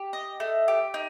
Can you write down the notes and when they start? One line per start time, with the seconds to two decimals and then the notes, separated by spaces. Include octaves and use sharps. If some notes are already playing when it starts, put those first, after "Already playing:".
Already playing: G4
0.13 D#5
0.40 A3
0.68 G4
0.94 D#4